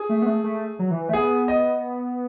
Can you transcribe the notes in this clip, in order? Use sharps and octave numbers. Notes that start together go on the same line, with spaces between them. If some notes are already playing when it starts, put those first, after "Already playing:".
Already playing: G#4
A3
B3
A3
A3
F#3
E3
A3
B3 G#4
D#5